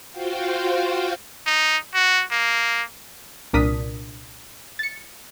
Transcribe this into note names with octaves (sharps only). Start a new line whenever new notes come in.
F4 F#4 C5 F5 G5
D#4
F#4
A#3
C2 A#2 D4 A#4 D#6 B6
A6 C#7